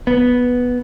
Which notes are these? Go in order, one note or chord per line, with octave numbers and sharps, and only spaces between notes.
B3